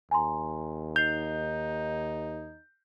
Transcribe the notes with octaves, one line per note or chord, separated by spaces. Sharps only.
D#2 G#5 A#5 C6
D#4 G6 C7 F7